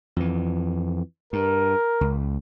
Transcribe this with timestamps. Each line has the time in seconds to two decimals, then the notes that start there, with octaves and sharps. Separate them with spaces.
0.16 F2 E3
1.33 G2 A#4
2.01 C#2